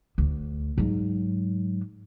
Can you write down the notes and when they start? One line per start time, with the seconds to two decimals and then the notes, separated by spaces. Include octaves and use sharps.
0.18 D2
0.78 G#2 F#3